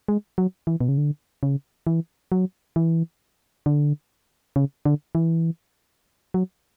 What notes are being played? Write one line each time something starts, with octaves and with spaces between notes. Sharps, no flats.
G#3
F#3
E3
B2
C#3
D3
C#3
E3
F#3
E3
D3
C#3
D3
E3
F#3